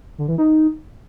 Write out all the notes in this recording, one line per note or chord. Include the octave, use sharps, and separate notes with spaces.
D3
E3
D#4